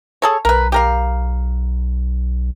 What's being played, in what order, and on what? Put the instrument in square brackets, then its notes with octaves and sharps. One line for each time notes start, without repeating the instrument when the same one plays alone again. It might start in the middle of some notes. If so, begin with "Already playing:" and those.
[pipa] G#4 A4 C#5
[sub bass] B1 [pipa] A#4 B4
[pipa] G4 A#4 F5